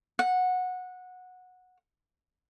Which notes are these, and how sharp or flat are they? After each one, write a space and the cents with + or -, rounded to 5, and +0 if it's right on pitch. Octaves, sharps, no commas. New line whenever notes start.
F#5 -15